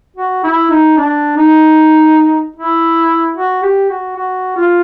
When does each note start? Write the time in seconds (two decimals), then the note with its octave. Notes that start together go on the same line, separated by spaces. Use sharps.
0.16 F#4
0.44 E4
0.70 D#4
0.97 D4
1.37 D#4
2.56 E4
3.36 F#4
3.62 G4
3.89 F#4
4.16 F#4
4.56 F4